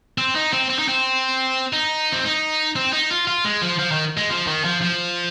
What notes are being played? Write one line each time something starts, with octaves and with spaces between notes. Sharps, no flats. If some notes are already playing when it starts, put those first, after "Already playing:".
C4
D#4
C4
C4
D#4
C4
D#4
C4
D#4
C4
D#4
F4
F4
G#3
F3
F3
D#3
G#3
F3
D#3
F3
F3